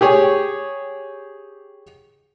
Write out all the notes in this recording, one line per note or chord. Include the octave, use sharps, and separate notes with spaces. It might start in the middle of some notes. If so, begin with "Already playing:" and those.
G4 G#4 C#5